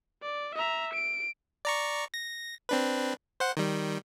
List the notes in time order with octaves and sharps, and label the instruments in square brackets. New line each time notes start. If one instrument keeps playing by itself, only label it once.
[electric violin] D5
E5 A#5
D7
[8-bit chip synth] D5 A#5 C#6
A#6
C4 D4 B4
C5 F#5
D#3 G3